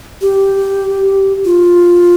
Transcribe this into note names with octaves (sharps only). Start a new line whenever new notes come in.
G4
F4